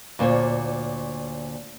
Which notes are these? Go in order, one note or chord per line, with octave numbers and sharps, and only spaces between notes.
D2 A#2 C5 C#5